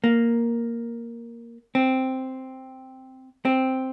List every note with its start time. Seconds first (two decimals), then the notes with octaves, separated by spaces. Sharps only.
0.04 A#3
1.75 C4
3.45 C4